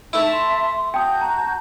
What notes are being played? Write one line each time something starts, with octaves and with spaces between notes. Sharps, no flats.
A3 D#4 E4 E5 A5
C6
F#4 G5 A5 D#6 G6
A#5